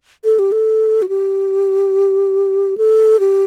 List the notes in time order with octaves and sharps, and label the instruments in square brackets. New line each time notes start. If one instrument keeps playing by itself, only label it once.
[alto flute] A4
G4
A4
F#4
G4
A4
G4